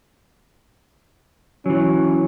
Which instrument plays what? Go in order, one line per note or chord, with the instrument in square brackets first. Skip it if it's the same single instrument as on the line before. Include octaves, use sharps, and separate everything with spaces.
[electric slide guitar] E3 F#3 [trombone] C#4